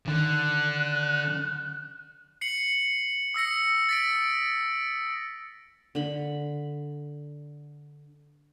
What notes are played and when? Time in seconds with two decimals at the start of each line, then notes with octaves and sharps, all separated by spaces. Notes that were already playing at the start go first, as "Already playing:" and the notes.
0.08 D3 D#3 F#6
2.41 C7 C#7 F#7
3.34 D#6 E6 A#6 C#7
3.89 A6 B6 D7
5.95 D3 B5